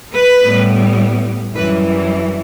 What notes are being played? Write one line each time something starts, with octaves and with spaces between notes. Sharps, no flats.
B4
A2 G3 B3
F#2 E3 G3 B4